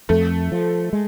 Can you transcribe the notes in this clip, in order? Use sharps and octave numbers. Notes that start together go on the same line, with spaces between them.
F2 A3
F3
G#3